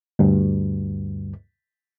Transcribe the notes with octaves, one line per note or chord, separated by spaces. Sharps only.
D2 G2